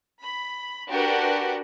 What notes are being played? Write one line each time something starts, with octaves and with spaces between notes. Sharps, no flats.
B5
D4 F#4 G4 A#4 B4 F#5